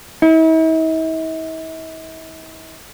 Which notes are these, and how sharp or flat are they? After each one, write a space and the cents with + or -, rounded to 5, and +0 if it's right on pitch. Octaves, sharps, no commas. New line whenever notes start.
E4 -45